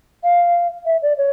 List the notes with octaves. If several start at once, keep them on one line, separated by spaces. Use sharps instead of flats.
F5
E5
D5
C#5